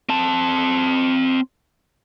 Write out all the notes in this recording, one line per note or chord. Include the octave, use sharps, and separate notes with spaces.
C4 A5